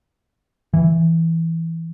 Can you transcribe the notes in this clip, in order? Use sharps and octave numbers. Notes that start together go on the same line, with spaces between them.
E3